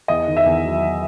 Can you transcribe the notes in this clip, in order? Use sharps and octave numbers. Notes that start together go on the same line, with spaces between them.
E2 D#5
D#3
E5
E2
F#3